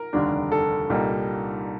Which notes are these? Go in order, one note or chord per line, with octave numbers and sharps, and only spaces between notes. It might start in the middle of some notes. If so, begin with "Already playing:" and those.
Already playing: A#4
F1 D#2 D3 G3 D4
A4
C2 A#2 G3 A#3 D#4